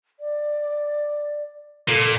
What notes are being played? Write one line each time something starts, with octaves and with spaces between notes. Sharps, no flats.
D5
A#2 A4